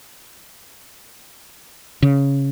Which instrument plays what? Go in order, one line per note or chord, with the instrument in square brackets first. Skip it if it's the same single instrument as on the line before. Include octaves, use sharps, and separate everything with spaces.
[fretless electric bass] C#3